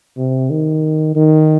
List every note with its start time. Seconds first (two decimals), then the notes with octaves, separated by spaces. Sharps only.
0.18 C3
0.50 D#3
1.16 D#3